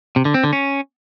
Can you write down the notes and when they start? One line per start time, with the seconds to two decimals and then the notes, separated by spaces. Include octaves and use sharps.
0.16 C3
0.25 D3
0.34 C4
0.44 D3
0.53 C#4